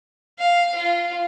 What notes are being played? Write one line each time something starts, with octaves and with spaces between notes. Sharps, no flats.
F5
F4